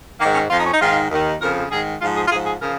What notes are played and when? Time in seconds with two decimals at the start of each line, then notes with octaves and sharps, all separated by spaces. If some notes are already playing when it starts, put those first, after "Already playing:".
0.20 D#3 A#3
0.24 G#2
0.35 C#4
0.50 F2 F3 F4
0.57 D#4
0.64 C#4
0.72 D#4
0.80 G#2 D#3 F4
1.10 D#2 D#3
1.40 F2 C#3 F3 A#4
1.70 G#2 D#3 G#4
2.01 G#2 F3 F4
2.15 G#4
2.27 F4
2.31 G#2 F3 G#4
2.46 G#4
2.60 C#3 F3 A#4